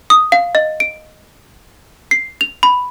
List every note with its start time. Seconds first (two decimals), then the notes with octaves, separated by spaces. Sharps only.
0.10 D#6
0.32 F5
0.55 D#5
0.80 D7
2.11 C7
2.41 F7
2.63 B5